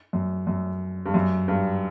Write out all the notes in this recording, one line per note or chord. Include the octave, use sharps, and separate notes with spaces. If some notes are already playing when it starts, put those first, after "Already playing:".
F#2
F#2
G2
F#2
G2